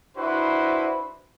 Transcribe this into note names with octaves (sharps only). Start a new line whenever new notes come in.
D4 E4 F#4 B4 C5